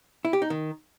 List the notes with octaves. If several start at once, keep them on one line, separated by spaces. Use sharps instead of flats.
E4
G4
D#4
D#3